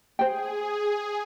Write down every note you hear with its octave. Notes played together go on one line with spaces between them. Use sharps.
G#4 C5 G5